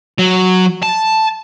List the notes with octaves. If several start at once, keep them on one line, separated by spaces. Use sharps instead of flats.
F#3
A5